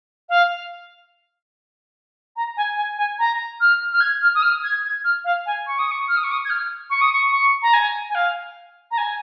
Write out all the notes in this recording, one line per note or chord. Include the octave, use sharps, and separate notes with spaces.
F5
A#5
G#5
G#5
G#5
A#5
F6
F6
G#6
F6
D#6
F6
G#6
G#6
F6
F5
G#5
C#6
D#6
C#6
F6
D#6
C#6
D#6
G#6
F6
C#6
D#6
C#6
C#6
A#5
G#5
G#5
F5
A#5
G#5